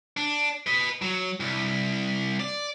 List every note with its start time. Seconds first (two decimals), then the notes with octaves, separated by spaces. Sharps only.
0.17 D4
0.67 B4 D#5
1.02 F#3
1.40 C2
2.40 D5